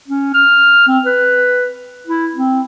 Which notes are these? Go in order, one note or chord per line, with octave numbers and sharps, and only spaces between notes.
C#4
F6
C4
B4
E4
C4